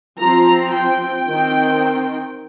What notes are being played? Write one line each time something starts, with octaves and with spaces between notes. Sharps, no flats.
F3 C4 A#5
G5
D#3 C4